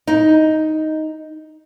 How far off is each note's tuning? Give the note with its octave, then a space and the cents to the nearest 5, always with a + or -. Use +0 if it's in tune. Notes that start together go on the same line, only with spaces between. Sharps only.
D#4 +5